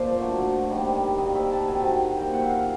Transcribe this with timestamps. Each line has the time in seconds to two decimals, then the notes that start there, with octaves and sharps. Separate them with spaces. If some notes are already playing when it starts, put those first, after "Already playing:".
Already playing: A#2 F3 C5 D5
0.20 D3 F#3 A3
0.69 C3 D#3 G3 A#3
1.18 D#3 G3 A#3 D#5
1.35 E5
1.51 A5
1.68 C3 D#3 F#3 G#5
2.17 A#2 G3 A#3 G5
2.33 F#5
2.42 E5
2.49 F5